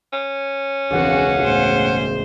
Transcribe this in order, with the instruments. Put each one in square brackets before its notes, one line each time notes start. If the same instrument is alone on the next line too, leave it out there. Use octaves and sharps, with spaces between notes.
[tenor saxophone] C#4
[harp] E1 C#2 [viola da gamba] C4 F#4 [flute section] F5 F#5
[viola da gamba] E2 A2 C5